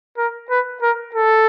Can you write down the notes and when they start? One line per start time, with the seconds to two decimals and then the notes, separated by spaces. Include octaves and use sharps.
0.18 A#4
0.50 B4
0.82 A#4
1.14 A4